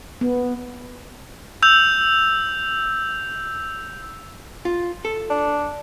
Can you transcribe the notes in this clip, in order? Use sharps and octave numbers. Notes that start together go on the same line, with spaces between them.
B3
E6 G6 F7
F4
A4
D4